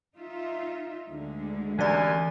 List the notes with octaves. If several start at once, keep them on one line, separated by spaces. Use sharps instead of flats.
D#4 F4 E5
D2 D3 G#3
F#2 C3 E3 D5 G#5